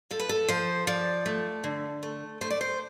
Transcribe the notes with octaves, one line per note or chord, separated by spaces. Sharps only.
F3 A4
B4
A4
F3 C5
F3 D5
A3
D3
A3
A3 C5
D5
C5